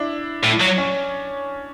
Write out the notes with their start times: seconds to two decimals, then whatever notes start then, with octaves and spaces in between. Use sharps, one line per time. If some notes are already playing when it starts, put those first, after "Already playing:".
Already playing: D4 E4
0.44 A2
0.61 F#3
0.78 C#4